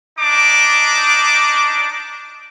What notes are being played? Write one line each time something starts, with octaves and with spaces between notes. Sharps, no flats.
D4 D#4 D6